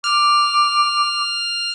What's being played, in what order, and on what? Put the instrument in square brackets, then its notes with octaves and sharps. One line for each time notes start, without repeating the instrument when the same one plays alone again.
[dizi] D6 [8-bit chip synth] F6